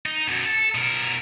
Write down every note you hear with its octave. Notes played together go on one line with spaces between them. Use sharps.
D#4
F#2 B2
A4
B2 A#4